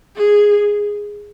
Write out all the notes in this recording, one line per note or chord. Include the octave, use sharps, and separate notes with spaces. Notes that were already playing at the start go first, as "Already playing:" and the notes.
G#4